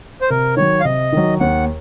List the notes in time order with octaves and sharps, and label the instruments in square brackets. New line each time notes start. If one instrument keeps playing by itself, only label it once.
[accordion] C5
[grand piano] C3 [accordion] A#4
[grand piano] D#3 F#3 [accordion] C#5
[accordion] F5
[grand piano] C3 [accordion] D#5
[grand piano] D#3 F#3
[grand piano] D#2 [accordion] F#5